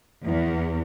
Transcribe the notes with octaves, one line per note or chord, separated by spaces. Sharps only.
E2